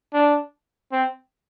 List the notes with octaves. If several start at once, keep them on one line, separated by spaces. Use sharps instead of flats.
D4
C4